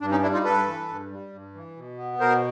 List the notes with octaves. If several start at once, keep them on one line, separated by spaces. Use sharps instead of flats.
G2 D4
C#4 D#4
G3 D4 E4
D#4 F4
G2 A4 B4
E3
G2
G3
G2
E3
B2
B3
B2 A#4 C5